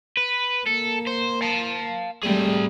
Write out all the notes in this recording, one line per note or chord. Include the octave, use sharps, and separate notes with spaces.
B4
A#3 A4
C5
F5 A5
G3 A3 C4 G#4